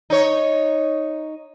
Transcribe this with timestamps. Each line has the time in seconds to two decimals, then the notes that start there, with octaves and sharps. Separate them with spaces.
0.10 D#4 C#5